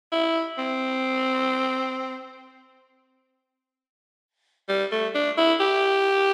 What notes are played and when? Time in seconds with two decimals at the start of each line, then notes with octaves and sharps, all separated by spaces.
0.12 E4
0.58 C4
4.69 G3
4.92 A3
5.15 D4
5.37 E4
5.60 G4